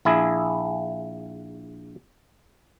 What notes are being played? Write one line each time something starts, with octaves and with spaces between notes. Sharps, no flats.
A#1 E4 G#4